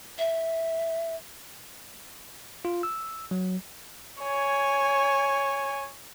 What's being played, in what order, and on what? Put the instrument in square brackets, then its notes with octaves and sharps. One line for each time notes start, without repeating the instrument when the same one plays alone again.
[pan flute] E5
[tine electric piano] F4
E6
F#3
[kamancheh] C#5 G#5